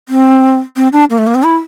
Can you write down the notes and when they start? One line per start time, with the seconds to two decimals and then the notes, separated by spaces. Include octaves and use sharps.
0.09 C4
0.76 C4
0.93 D4
1.10 A#3
1.18 A3
1.27 A#3
1.35 C4
1.43 E4